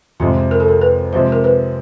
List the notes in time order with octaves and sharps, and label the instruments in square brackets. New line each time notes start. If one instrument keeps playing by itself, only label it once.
[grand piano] F2 C3 F3 G#3 [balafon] F4
[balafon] A#4
A4
A#4
B4
[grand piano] C3 F3 G#3 [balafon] C5
[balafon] A#4
B4